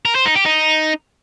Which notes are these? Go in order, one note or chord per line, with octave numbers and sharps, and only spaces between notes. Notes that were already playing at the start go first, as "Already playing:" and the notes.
A#4
C5
D#4
G4
D#4